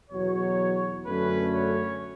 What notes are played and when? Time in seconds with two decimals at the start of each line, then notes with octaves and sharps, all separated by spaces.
0.11 E2 B2 F#3 C#5
1.06 F#2 D3 A3 C#4 B4
1.54 C#5